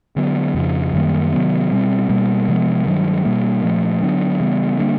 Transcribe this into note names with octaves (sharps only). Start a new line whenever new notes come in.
D3 F#3 B3
F2 C#3 F3
F#2 D#3 G3 A#3
C3 D#3 F#3 B3
B2 G3 C4
B2 G3 A#3
C3 F3 G#3 B3
G2 D#3 F#3
B2 G3 A#3
A#2 F3 A3
D3 F#3 B3 D4
C#3 E3 G3 B3
D3 G3 A#3 D4